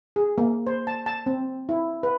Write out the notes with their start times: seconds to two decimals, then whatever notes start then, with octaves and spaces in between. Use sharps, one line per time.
0.16 G#4
0.38 A#3
0.67 C5
0.87 A5
1.06 A5
1.26 C4
1.69 E4
2.03 B4